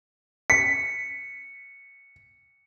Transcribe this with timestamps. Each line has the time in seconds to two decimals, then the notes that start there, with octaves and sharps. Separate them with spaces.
0.50 B6 C#7